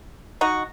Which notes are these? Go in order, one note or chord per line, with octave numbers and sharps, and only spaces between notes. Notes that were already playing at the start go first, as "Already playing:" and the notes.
D#4 F#4